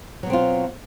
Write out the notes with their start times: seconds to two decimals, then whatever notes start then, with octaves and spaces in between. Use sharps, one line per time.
0.23 F#3
0.26 B2
0.30 C4
0.33 F4